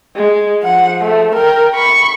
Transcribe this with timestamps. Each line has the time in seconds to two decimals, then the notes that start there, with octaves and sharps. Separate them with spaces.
0.16 G#3
0.64 F3 F#5
1.01 A3
1.34 A#4 G5
1.75 B5 C#6